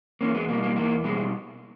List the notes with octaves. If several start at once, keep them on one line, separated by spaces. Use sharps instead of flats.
E2 A#3 C#4
G#3 B3
B2 G3 A#3
A#3
E2 A#3
B2 G3 G#3